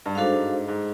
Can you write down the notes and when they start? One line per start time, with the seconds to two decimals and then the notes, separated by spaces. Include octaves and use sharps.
0.06 G2
0.15 G#2 D4 F#4 A4 C5 F5
0.33 G#2
0.68 G#2